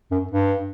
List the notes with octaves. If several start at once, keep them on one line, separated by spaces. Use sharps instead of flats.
F#2
G2